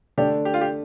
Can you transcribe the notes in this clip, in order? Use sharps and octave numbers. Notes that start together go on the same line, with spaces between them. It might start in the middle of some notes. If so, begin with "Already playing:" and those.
D3 A3 D4 G4 A4 D5
G4
F4
G4